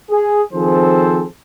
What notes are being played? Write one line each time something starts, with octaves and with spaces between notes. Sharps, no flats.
G#4
D#3 F3 C4 G#4 A4 C5